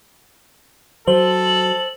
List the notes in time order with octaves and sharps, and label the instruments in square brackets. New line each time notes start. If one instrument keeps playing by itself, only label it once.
[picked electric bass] F#3 [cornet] A4 [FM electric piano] C5 [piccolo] F#7